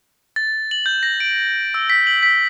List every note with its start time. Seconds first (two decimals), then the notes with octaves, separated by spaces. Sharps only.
0.36 A6
0.71 F#7
0.86 G6
1.03 A#6
1.20 D7
1.74 E6
1.90 B6
2.07 F#7
2.23 B6